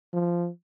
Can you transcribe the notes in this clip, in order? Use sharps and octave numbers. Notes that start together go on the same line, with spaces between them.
F3